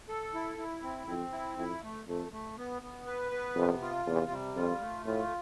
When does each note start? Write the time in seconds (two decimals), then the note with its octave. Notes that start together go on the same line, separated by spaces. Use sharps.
0.09 A4
0.34 E4
0.58 E4
0.83 C4
1.07 F2 C4
1.32 E4
1.58 F2 E4
1.83 A3
2.08 F2 A3
2.32 A3
2.58 B3
2.82 B3
3.07 B4
3.32 B3
3.56 F2 C3
3.82 F4
4.06 E2 C3
4.31 G3
4.56 F2 F4
4.81 A3
5.06 A2 F4